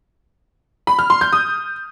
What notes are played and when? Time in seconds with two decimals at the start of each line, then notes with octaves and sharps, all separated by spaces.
0.87 B5
0.99 F6
1.10 C6
1.21 G6
1.33 D#6